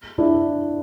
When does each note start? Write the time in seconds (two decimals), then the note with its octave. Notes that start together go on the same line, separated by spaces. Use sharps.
0.18 D4 E4